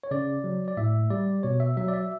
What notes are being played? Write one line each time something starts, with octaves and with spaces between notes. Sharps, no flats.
C#5
C#3 D5
F#3
D5
A2 E5
G3 D5
B2 C#5
E5
F#3 E5
D5
E5